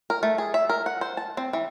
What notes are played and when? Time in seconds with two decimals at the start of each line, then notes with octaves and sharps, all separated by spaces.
0.10 A#4
0.23 A3
0.38 G#4
0.54 E5
0.69 A#4
0.86 F#5
1.01 C5
1.17 A5
1.37 C4
1.53 E3